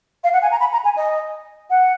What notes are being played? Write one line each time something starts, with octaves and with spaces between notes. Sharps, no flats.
F5
F#5
G#5
A#5
B5
A#5
G#5
D#5
F#5